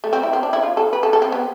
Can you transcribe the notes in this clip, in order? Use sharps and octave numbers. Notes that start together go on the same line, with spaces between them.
A3
C4
E4
C4
D4
E4
F4
A4
B4
A4
A4
C4
B3